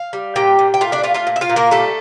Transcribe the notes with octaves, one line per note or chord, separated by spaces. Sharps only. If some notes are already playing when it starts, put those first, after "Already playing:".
Already playing: F5
G3
A#2 G4 G5
A#2
G5
A3 F4 F5
D4 D5
A3 F4 F5
F4 F5
A#2
E5
F4 F5
A#2
A#3 A#4
G3 A3 A4